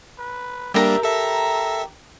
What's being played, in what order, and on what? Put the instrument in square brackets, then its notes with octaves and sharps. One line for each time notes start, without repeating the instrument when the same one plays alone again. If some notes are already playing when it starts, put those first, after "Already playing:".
[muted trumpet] B4
[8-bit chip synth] G3 A#3 D4 [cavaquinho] G4 A#4 [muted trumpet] E5
[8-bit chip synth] A4 E5 [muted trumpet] A#5